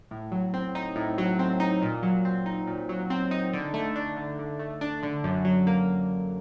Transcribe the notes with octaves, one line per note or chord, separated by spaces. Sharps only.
A2
F#3
C4
D#4
A2
F#3
C4
D#4
A#2
F#3
C4
D#4
A#2
F#3
C4
D#4
D3
A3
D4
D3
D3
A3
D4
D3
F#2
F#3
A#3